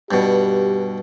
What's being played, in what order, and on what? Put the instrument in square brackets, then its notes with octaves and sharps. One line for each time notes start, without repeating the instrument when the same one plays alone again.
[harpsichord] G2 B2 [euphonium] G4